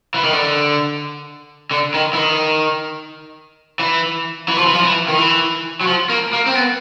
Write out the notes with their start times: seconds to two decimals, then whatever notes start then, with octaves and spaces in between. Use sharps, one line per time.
0.14 E3
0.24 D#3
0.33 D3
1.71 D3
1.94 D#3
2.13 E3
2.17 D#3
3.79 E3
4.48 E3
4.57 F3
4.66 E3
4.73 F3
4.83 E3
5.08 D#3
5.17 E3
5.81 F#3
5.87 F3
6.09 A#3
6.33 A#3
6.46 C4
6.55 B3